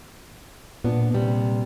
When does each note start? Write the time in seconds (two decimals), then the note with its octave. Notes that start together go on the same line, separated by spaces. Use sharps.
0.84 A#2 B3 D4
1.14 C3 G3